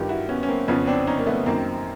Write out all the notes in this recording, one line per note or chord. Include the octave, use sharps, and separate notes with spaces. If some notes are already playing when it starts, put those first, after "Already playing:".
Already playing: G2 D#3 F4 G4
E4 F#4
B3 C#4
C#4
A#3 C4
F2 C#3 F3 B3 C#4
C4 D4
C#4 D#4
A#3
A3 B3
F#2 D#3 A#3 C4